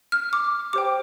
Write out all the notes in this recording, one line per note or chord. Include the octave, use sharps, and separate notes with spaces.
F6
D6
G4 C5 G5 D6